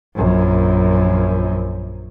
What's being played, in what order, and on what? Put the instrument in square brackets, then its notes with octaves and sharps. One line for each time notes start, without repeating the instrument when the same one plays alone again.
[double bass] A#1 F#2